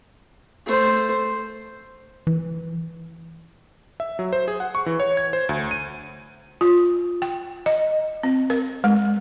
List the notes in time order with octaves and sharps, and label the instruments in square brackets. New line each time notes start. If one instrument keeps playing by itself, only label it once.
[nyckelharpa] A3 C5
[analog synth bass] E3
[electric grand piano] E5
F#3
C5
G#4
F#5
C#6
E3
C#5
G#6
C5
D2
D#7
[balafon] F4
G5
D#5
C4
A#4
G#3